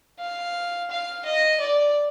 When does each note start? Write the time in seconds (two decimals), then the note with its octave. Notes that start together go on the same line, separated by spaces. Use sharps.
0.19 F5
0.90 F5
1.25 D#5
1.60 D5